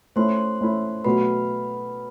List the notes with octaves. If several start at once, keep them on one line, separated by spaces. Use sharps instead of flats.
A3 C#4 E4 C5 C6
A3 C#4 E4
B2 F#3 A3 B4 B5